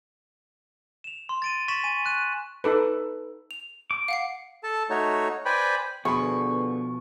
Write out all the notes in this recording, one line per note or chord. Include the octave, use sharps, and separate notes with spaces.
E7 F7
C6
A6 D7 D#7
C#6 A6 B6 E7 F#7
G#5 D#7
C#6 F#6 D#7
D#4 A4 B4
F7
D6
F5 F#5 C7
A4 A5
A3 D#4 F#4 C#5
B4 C5 D5 G5 G#5 B5
B2 D3 F3 B3 G#4 B5 C#6